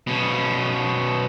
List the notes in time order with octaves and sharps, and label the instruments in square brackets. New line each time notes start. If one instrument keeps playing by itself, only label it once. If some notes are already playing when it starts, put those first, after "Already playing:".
[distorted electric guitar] B2 C#4